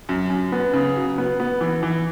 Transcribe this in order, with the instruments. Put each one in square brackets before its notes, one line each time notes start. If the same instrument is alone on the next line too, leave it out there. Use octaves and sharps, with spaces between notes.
[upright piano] F#2
F#2
B3
C#3
F#3
B3
B3
E3
E3